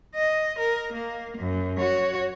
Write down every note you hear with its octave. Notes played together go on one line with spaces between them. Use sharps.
D#5
A#4
A#3
F#2
F#4 C#5